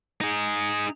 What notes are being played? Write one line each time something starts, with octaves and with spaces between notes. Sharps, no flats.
D#4 G#4